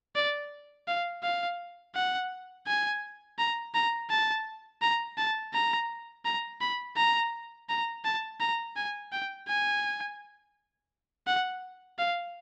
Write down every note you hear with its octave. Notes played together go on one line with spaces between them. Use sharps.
D5
F5
F5
F#5
G#5
A#5
A#5
A5
A#5
A5
A#5
A#5
B5
A#5
A#5
A5
A#5
G#5
G5
G#5
F#5
F5